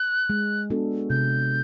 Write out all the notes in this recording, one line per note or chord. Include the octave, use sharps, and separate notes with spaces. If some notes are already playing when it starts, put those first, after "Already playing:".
Already playing: F#6
G#3
B3 D4 F#4 A4
C3 G6